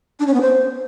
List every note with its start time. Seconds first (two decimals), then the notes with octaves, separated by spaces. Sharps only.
0.20 D4
0.27 C#4
0.34 B3
0.41 C5